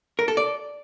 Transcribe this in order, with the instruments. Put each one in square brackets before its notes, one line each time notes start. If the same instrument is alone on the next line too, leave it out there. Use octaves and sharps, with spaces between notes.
[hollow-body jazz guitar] A#4
A4
D5